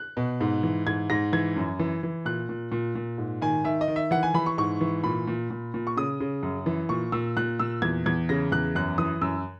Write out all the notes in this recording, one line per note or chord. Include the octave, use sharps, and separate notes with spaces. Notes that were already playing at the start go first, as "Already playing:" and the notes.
Already playing: F#6
B2
G#2
E3
G#2 G#6
G#2 A#6
E3 G#6
F#2
E3
E3
A#2 F#6
A#2
A#2
A#2
G#2
D#3 G#5
D#3 E5
D#5
D#3
E5
E3 F#5
G#5
E3 B5
C#6
G#2 C#6
E3
A#2 B5
A#2
A#2
A#2
C#6
C#3 D#6
C#3
F#2
E3
A#2 C#6
A#2 E6
A#2 F#6
A#2 E6
E2 G#6
E2 G#6
C#3 A#6
E2 F#6
F#2 F#6
E3 D#6
F#2 E6